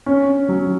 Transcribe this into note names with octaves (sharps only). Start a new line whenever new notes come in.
C#4
F#3